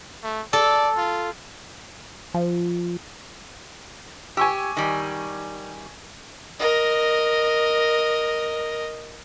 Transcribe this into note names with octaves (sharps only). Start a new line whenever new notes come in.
A3
A4 D5
F4
F3
G4 G#5 C#6 E6
D#3 G3
A#4 D#5